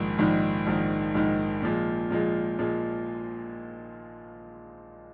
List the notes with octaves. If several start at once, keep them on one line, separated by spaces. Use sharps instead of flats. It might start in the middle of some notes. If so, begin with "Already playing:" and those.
Already playing: A#1 G#2 D#3
A#1 G#2 D#3
A#1 G#2 D#3
A#1 G#2 D#3
A#2 F3 G#3
A#2 F3 G#3
A#2 F3 G#3